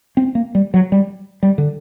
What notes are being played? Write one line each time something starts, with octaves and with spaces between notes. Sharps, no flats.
C4
A#3
G3
F#3
G3
G3
D3